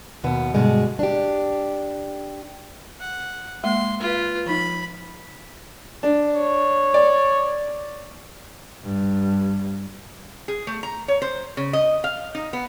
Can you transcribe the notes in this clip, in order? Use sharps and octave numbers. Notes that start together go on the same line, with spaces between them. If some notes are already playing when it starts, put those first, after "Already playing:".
D#2 B2 B3
G2 B2 D3 G#3
D4 G4
F#5
G#3 A#3 C6
F4 B4
F3 D#4 B5
D4
C#5
D5
G2
G#4
A3
A#5
C#5
C5
C#3
D#5
F5
D#4
B3